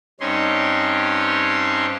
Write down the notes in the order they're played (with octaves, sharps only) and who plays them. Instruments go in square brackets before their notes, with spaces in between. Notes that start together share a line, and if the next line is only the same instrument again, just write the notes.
[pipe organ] G2 C4 C#4 D#4 C#5 C6